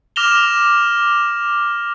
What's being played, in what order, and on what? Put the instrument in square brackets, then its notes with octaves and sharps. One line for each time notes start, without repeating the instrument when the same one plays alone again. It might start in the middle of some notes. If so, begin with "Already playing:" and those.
[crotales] D6 F6 A#6 E7 F7 G7